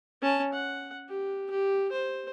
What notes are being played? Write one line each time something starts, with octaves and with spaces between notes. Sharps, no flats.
C#4 A5
F#5
G4
G4
C5